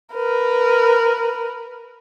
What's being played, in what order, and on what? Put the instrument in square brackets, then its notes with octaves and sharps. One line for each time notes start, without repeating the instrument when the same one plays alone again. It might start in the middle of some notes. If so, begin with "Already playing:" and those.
[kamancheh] A#4 B4